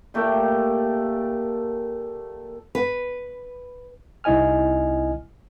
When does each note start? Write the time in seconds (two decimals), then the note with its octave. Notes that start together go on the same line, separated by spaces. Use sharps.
0.14 A#2 A3 G4 A#4
2.75 B4
4.24 C2 D#4 E4 D#5 G#5 F6